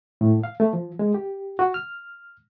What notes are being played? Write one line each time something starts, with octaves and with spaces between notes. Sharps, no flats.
A2
F5
A3
F3
G#3
G4
F#4
F6